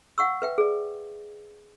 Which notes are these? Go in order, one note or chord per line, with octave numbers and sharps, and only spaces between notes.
F5 F#5 C#6 E6
B4 E5 G5
G#4 D5